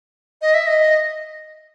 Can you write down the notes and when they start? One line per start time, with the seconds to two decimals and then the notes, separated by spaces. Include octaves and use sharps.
0.42 D#5
0.54 E5
0.67 D#5